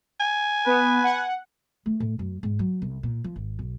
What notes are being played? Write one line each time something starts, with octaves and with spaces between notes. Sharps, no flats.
G#5
B3 B4
F#5
A3
A2
F#2
G#2
F#3
C2
A#2
F3
G#1
B1